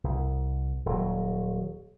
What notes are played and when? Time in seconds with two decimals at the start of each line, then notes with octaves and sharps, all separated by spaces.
0.04 C2
0.86 D#1 F#3